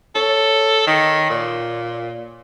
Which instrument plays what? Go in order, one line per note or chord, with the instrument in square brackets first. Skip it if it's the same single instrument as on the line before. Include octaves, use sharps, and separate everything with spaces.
[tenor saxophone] A4 [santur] C#5
[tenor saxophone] D#3
A#2